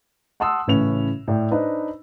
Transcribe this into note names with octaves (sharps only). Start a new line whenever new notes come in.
F#5 A5 C6 D#6 E6
A1 A2 C#3 C#4 B4 F7
A2 D5 G5
D4 D#4 B4 C5 D#5